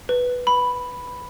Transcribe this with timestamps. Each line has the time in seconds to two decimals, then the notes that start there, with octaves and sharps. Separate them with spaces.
0.09 B4
0.47 B5